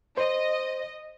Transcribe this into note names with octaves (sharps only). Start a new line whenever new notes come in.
C5 D#5